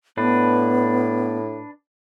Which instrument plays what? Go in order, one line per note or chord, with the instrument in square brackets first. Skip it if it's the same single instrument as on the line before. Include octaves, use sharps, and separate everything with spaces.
[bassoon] A2 [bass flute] B3 [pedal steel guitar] D4 B4